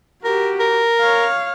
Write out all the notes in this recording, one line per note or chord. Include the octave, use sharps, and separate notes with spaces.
F#4 G4 A#4
A#4
C#5 F5